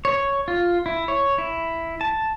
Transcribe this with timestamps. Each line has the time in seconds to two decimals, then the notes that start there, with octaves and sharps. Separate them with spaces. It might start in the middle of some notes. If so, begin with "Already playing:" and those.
0.05 C#5
0.48 F4
0.86 E4
1.08 C#5
1.38 E4
2.01 A5